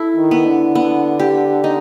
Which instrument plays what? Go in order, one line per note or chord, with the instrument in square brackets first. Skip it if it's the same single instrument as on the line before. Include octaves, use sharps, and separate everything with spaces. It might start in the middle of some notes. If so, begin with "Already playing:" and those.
Already playing: [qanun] E4 A4
[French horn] D#3
[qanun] B3
[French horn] D3
[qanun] B3
G4
D#4